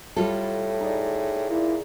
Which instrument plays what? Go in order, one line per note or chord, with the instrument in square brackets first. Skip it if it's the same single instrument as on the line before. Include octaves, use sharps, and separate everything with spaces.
[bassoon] A2 [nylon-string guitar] G3 F4 A4
[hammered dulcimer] D#4 G#4 D5
[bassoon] A#2 [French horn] E4